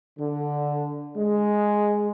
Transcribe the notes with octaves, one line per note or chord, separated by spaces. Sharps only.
D3
G#3